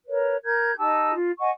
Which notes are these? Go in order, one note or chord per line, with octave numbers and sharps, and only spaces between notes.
A#4 B4 C#5
A#4 G6 G#6
D#4 G4 A5 E6
F4
D#5 F#5 G#5 C#6